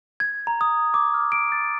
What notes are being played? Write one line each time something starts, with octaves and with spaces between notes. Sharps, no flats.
G#6
A#5
D#6
D6
F6
D7
A6